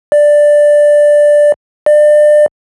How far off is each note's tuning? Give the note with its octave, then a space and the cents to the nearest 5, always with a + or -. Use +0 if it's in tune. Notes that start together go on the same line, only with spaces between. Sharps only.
D5 +5
D5 +30